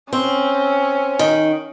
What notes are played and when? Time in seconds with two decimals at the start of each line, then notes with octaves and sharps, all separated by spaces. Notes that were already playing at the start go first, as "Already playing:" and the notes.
0.13 C4 C#4
1.19 D#3